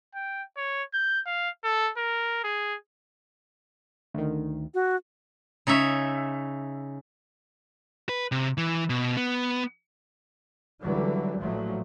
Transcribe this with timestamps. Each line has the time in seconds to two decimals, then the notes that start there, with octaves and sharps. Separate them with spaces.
0.15 G5
0.57 C#5
0.94 G6
1.26 F5
1.64 A4
1.97 A#4
2.44 G#4
4.14 D2 D#3
4.74 F#4
5.67 C#3 D#4 C#5 E5
8.09 B4
8.32 C3
8.58 E3
8.90 B2
9.17 B3
10.82 C#2 D3 E3 F#3 G3
11.39 A1 A#2 F3 F#3 A3